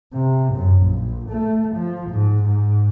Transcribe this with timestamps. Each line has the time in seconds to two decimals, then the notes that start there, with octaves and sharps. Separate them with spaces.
0.13 C3
0.54 F#2
0.83 A#1
1.30 A3
1.75 F3
2.10 G#2
2.43 G#2